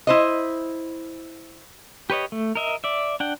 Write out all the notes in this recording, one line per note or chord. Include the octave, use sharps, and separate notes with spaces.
E4 C5 D#5
G4 B4 C#5 D#5
A3
A#4 D#5 E5
D5 E5
D4 F#5 G5